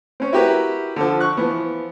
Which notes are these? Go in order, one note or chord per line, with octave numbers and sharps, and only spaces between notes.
C4 C#4
E4 F#4 G4 A#4 B4
D3 F3
C#6 F#6
E3 F3 B3